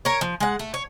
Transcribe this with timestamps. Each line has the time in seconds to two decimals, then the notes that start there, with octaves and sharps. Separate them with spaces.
0.05 A#4 C#5
0.21 F3
0.40 G#3 F#5
0.59 A3
0.74 C#5